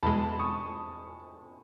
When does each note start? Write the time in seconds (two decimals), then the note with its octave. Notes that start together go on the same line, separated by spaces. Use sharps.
0.03 E2 B2 G#3 A5 B5
0.39 C#6 D#6